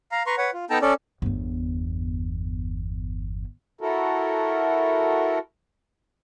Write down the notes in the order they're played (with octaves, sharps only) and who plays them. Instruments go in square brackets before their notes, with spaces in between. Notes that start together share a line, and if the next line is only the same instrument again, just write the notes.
[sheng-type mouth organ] F5 A#5
B4 A#5 C6 C#6
B4 C#5 F#5
F4
B3 D#4 A4 G5 A5 A#5
C#4 A4 D5
[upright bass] G1 E2
[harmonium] E4 F#4 A4 A#4